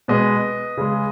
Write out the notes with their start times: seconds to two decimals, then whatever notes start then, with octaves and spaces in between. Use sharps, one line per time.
0.08 B2 G#3 B4 D#5
0.77 C#3 G#3